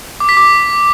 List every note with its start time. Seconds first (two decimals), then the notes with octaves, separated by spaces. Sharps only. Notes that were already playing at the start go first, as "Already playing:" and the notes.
0.20 D6
0.29 B6
0.37 D6